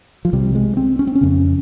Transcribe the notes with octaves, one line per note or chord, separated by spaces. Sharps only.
F3
C2 C3 G3
G#3
C4
C#4
C4
C#4
F2 C#3